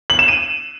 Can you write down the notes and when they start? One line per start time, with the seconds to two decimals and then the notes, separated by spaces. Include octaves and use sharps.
0.10 F#7
0.19 E7
0.28 D#7